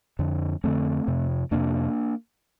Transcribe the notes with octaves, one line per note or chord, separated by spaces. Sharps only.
F2 D3
F2 D3 A3 C4
F2 C3
F2 C3 A#3 D4